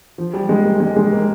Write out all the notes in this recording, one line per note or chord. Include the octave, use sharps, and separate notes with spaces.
F3
G3
G#3
A#3
G#3
G#3
A#3